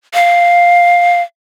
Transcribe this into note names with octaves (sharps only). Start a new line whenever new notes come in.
F5